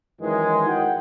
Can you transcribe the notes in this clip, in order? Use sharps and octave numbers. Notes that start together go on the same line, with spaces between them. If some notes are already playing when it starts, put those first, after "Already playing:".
F#2 D#3 E3 G#3
F#4 F#5 G5